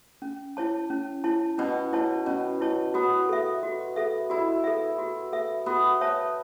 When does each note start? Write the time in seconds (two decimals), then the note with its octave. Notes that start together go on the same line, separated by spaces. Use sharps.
0.22 C#4
0.57 E4 C#5 A5
0.90 C#4
1.24 E4 C#5 A5
1.58 B2 C#4
1.93 E4 C#5 A5
2.26 B2 C#4
2.61 E4 C#5 A5
2.94 B3 F#4
3.29 A4 E5
3.63 F#4
3.96 A4 E5
4.30 E4 F#4
4.64 A4 E5
4.98 F#4
5.33 A4 E5
5.66 B3 F#4
6.01 C#5 E5 A5